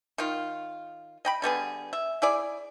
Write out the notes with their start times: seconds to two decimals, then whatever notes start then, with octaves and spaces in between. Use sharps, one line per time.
0.18 D#3 F4
1.25 D#5 G5 B5
1.42 D3 G3 B3 G#4
1.93 E5
2.22 E4 G#4 D5